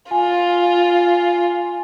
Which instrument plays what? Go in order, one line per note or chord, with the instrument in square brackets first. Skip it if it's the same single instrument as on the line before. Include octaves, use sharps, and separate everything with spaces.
[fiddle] F4 [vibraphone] G#5